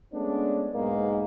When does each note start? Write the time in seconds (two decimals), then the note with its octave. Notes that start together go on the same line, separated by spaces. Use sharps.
0.13 G#3 A3 B3 C#4 D4
0.74 B1 G#2 G#3 A#3 B3 B4